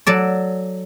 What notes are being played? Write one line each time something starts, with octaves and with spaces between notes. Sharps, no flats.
F#3 A4 D5